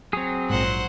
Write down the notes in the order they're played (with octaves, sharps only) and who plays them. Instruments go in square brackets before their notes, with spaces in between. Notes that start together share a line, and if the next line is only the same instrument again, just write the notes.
[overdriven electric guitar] F#3 [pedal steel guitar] C4 G#4
[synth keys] A#1 G#2 [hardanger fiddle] C5 F#5